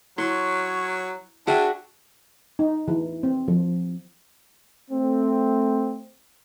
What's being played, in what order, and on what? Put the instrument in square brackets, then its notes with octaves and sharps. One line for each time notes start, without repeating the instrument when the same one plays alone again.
[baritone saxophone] F#3 [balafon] E4 [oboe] C#5 [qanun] C6
[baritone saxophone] D4 [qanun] F#4 E5 G#5 [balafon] G#4 G5
[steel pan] D#4
E3
C4
F3
[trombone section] A3 C4